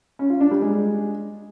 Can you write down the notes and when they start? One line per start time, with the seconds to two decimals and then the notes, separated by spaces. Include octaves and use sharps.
0.19 C#4
0.30 F4
0.41 D4
0.51 G3
0.62 G#3